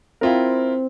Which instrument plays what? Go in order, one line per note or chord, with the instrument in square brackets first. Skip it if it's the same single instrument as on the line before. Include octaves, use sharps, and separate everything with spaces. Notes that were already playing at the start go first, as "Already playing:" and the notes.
[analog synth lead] C4 [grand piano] E4 F4 A#4